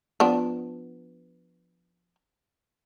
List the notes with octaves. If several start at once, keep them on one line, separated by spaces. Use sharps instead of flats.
F3 B3 D4